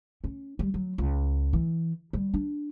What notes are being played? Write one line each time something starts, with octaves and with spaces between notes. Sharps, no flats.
C#4
G3
F#3
C#2
E3
G3
D4